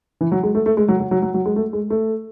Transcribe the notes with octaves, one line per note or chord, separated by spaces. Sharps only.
E3
F#3
G#3
A3
A3
G#3
F#3
F#3
F#3
F#3
F#3
G#3
A3
G#3
A3